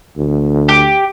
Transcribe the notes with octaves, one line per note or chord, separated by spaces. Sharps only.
D2
G4